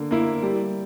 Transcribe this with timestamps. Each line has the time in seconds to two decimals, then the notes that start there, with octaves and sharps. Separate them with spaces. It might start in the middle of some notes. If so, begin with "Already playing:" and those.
Already playing: D3 A#3
0.11 A#3 E4
0.43 G3